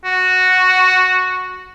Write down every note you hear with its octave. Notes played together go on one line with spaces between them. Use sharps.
F#4